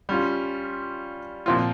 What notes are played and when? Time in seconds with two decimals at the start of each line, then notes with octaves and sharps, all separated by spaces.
0.09 G3 C#4 F4
1.46 A#2 F3 C4 F4